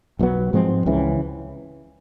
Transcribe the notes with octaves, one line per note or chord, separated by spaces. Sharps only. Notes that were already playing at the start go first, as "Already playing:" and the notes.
B1 A#2 F#3 B3
G#2 F3 G#3 C4
C#2 C#3 E3